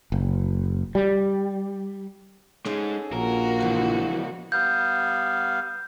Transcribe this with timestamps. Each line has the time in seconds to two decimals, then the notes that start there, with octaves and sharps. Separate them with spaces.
0.12 F#1
0.95 G3
2.65 G#3 C#4 D#4 G#4 A4
3.13 A#1 A#3 F#4 A#4
3.60 C#2 C3 E3 F3
4.52 G3 B3 F5 G6